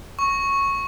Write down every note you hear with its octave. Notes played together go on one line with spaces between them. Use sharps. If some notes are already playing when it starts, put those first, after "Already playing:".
C#6